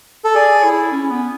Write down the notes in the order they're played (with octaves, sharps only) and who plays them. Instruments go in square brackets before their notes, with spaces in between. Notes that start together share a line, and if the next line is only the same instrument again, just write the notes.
[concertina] A4
[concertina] G#4 [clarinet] D5
[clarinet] E4
C#4
B3